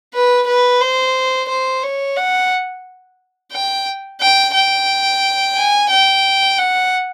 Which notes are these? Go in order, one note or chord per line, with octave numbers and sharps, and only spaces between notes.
B4
B4
C5
C5
C#5
F#5
G5
G5
G5
G#5
G5
F#5